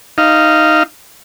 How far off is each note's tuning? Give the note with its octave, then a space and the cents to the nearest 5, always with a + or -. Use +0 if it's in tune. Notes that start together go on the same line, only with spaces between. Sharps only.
D#4 +0 F5 -15